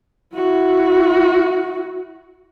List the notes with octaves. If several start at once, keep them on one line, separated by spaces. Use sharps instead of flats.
E4 F#4